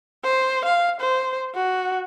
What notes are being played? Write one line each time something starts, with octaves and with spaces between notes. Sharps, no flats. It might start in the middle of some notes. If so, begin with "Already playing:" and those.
C5
F5
C5
F#4